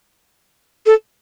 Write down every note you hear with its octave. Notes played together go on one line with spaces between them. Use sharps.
A4